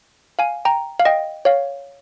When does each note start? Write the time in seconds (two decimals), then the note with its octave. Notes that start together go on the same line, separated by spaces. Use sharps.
0.39 F5 G#5
0.65 G5 A#5
1.00 F5
1.05 D#5 G5
1.45 C#5 F5